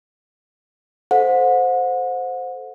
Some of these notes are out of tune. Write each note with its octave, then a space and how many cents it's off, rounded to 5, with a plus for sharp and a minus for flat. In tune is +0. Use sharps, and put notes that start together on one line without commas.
A4 +0 C5 -5 F#5 -35